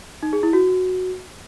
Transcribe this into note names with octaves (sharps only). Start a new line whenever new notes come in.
D#4
G#4
E4
F#4